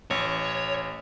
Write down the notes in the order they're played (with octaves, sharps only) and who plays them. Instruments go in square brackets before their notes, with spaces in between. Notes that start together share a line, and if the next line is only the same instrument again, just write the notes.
[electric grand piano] A1 [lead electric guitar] C#5